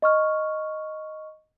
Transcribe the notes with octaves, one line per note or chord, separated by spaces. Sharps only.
D#5 C#6 F6